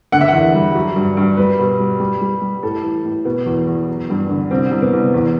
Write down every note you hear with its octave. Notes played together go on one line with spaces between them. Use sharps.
D3 F#5
E5
E2 F#5
G3
F#3
G2
G2
G3 B4
B2
G3
G3
G3
G3
A2 A4
E3
A2
B2 B3
E2
E2
F#3
G2
D3
C2 C4
C2
B3
C2
E2